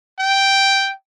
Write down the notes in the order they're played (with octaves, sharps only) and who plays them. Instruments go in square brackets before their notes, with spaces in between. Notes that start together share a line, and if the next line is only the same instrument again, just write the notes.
[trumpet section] G5